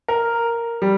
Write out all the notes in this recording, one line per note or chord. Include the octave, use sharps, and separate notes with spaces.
A#4
G3